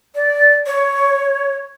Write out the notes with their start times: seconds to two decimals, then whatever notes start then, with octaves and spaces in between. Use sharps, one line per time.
0.15 D5
0.67 C#5